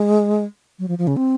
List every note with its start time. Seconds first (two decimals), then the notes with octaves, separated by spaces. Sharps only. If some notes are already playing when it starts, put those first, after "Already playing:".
Already playing: G#3
0.79 F#3
0.88 F3
0.98 F3
1.07 C#3
1.17 C4